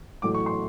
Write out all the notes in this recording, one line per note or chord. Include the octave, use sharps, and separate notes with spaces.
A1 A2 F#3 A3 D6
C#6
C6